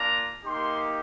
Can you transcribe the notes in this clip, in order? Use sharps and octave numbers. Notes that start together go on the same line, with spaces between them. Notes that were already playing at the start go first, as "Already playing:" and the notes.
Already playing: A#3 D4 F4 A#5
A#3 D#4 G4 C6